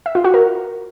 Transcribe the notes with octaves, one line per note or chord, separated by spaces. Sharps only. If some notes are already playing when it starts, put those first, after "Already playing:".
E5
F4
F#4
A#4